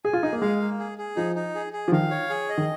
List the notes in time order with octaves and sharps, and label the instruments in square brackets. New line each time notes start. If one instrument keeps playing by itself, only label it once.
[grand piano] G#4 [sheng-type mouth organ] G#5
[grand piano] F4
[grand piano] D#4 [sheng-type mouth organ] G#4
[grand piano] A#3
[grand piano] G#3 [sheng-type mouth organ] F5
[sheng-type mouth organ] A#3
G#4
G#4
[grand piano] F3 [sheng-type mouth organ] D#4
[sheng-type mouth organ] D#4
G#4
G#4
[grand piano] F3
[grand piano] D#3 [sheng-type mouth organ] F5
[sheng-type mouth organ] C#5
G#4
D#5
[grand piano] D#3